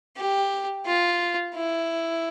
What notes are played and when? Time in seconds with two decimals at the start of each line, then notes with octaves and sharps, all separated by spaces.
0.17 G4
0.86 F4
1.56 E4